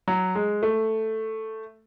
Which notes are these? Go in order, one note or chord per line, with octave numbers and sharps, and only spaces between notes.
F#3
G#3
A3